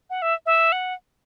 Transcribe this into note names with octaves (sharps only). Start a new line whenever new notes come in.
F#5
E5
E5
F#5